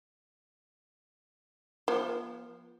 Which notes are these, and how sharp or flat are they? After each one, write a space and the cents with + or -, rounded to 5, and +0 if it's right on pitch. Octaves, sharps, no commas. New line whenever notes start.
F3 +0 B3 -45